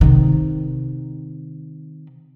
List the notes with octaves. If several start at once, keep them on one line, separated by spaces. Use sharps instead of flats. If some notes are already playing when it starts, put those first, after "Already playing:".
C3 D#3